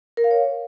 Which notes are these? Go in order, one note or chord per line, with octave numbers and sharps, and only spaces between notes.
A#4
F5
C#5